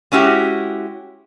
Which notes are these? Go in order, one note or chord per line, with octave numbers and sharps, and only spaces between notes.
G#3 C#4 E4 F#4 G4